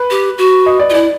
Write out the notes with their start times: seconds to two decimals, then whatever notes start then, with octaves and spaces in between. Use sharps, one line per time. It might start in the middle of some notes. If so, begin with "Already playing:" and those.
Already playing: B4
0.10 G4
0.38 F#4
0.66 D#5
0.79 D5
0.90 F4
0.94 E4 D5